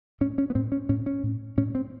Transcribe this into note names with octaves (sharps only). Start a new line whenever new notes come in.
A2 C#4
C#4
B3
A2 C4
C#4
A2 C#4
C#4
A2
A2 C#4
C4